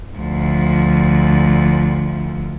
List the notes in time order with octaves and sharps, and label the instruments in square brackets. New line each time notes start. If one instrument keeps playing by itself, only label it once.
[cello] D2 F3